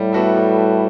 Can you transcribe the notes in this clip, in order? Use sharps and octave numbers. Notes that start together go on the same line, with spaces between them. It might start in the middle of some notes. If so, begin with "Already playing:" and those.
Already playing: A2 G3
B3 F#4 A4 E5
G3